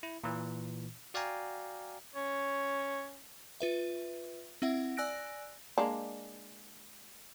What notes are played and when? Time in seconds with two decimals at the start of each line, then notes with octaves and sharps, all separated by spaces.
0.03 E4
0.24 A#2 E3
1.14 F#4 D5 F5 G5 G#5 A#5
2.15 C#4 C#5
3.60 F4 B4 E5
4.62 C4 E4 E5 F#5
4.97 D5 G#5 E6 F#6 A#6 D7
5.78 G#3 A#3 D4